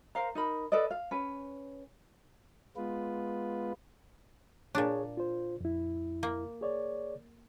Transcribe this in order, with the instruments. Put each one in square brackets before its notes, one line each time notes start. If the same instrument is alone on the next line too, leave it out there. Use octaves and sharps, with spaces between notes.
[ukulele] A#4 C5 F5 A#5
D#4 A#4 B5
A4 B4 D5 D#5
F5
C#4 B4
[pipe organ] G#3 B3 F4 B4
[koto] A#2 D4 [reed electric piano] G#4 C#5
[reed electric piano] F4 C5
F2 E4
[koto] A#3
[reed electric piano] G#4 C#5 D5